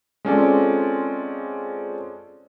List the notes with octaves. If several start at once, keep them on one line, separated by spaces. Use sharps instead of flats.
G#3 C4 C#4 F4 A4 D5